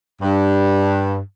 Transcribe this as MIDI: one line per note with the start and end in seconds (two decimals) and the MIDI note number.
0.22 1.18 43